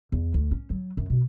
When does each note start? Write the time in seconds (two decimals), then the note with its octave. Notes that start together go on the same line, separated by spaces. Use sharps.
0.12 E2
0.34 D2
0.51 C#4
0.70 F#3
0.97 F#2
1.10 B2